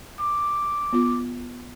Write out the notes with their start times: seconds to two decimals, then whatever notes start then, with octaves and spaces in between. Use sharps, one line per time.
0.20 D6
0.93 B3 F4